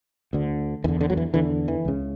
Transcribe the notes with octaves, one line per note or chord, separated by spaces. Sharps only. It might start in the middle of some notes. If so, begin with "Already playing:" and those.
D2 D3
E2 D3 E3
D3
F#3
E3
E2 D3 E3
E3
C#2 C#3